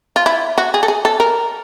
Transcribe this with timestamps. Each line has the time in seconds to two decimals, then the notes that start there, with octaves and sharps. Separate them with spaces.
0.16 F4
0.26 E4
0.58 F#4
0.74 G#4
0.83 A4
0.88 G#4
1.05 A4
1.20 A#4